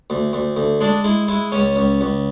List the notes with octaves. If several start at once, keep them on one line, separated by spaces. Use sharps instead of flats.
D2
D2
D2
G#3 D4
G#3 E4
G#3 E4
C#2 C#4
C#2
C#2